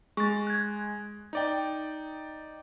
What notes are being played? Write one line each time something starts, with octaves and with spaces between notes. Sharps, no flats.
G#3 C#6 A6
F#6 G#6
D#4 D5 G5